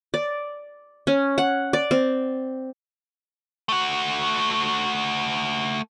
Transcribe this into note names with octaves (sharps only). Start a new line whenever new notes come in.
D5
C#4
F#5
D5
C4
A3 F#4